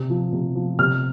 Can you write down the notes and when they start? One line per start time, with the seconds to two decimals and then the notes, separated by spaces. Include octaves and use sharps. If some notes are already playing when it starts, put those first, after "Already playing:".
Already playing: C3
0.10 F3
0.33 C3
0.55 F3
0.79 C3 F6